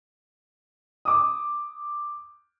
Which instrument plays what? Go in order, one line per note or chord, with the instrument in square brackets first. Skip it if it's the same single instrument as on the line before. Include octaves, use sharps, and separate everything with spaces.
[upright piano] D6 D#6